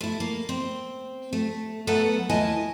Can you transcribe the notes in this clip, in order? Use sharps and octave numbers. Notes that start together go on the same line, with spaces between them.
A3 E4
A#3
C4
A3
F#3 A3 B3 A4 B4 F#5
D#2 A3 E4 D#5 G#5 A5